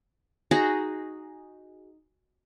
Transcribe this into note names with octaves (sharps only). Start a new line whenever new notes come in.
D#4 F#4 G#4